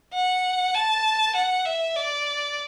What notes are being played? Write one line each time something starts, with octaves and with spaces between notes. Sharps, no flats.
F#5
A5
F#5
E5
D5